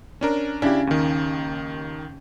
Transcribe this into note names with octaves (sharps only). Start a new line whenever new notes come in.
C#4 D4 A#4
C#3 D4 E4 G4
D#2 D#3